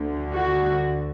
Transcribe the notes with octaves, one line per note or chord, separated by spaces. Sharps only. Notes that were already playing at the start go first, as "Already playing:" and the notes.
Already playing: D2 D3
F#4